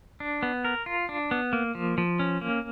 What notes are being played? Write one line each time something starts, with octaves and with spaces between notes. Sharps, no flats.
D4
B3
A#4
F4
D4
B3
A#3
F3
F3
C#4
A#3